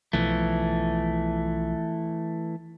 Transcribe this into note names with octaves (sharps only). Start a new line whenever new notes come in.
B1 E3 F3 A3